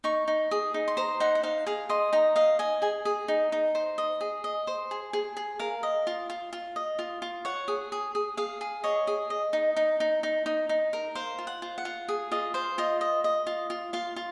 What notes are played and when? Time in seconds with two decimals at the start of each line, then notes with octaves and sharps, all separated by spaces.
0.04 D#4 C#6
0.28 D#4
0.51 G#4
0.74 D#4
0.88 C6
0.97 C5 A#5
1.20 D#4 F#5
1.35 F#5
1.43 D#4 F5
1.67 G#4 F5
1.89 D#5 C6
2.13 D#4 A#5
2.36 D#5 F5
2.59 D#5 G#5
2.82 G#4 G#5
3.05 G#4
3.28 D#4
3.52 D#4
3.75 C5
3.98 D#5
4.21 G#4
4.44 D#5
4.67 C5
4.91 G#4
5.13 G#4
5.37 G#4
5.59 A#4 F5
5.83 D#5
6.07 F4
6.30 F4
6.53 F4
6.76 D#5
6.99 F4
7.22 F4
7.45 C#5 F#5
7.68 G#4
7.92 G#4
8.15 G#4
8.37 G#4 F5
8.61 G#4
8.84 C#5 D#5
9.07 G#4
9.30 D#5
9.53 D#4
9.76 D#4
10.00 D#4
10.23 D#4
10.46 D#4
10.69 D#4
10.93 A#4
11.15 C5 F5
11.39 F4
11.47 F#5
11.62 F4
11.78 F#5
11.85 F4
12.09 G#4
12.31 F4 D#5
12.54 C5 F5
12.78 F4 D#5
13.01 D#5
13.24 D#5
13.47 F4
13.70 F4
13.93 F4 F5
14.16 F4